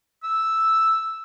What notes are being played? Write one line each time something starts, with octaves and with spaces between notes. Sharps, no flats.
E6